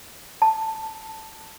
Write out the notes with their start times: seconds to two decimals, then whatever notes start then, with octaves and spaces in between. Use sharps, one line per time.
0.42 A5